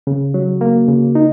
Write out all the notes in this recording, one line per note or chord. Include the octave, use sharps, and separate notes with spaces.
C#3
F#3
A#3
C#3
D#4